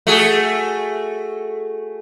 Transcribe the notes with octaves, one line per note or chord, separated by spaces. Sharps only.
A3 F#4 G#4